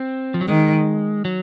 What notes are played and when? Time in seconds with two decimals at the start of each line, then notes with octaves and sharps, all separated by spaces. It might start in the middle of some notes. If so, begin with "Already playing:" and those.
Already playing: C4
0.34 F3
0.41 F#3
0.48 D#3 G#3
1.25 F#3